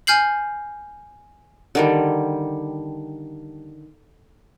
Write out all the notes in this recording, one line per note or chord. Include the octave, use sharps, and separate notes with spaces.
G#5 F6 G6 C7 F#7
D3 D#3 G3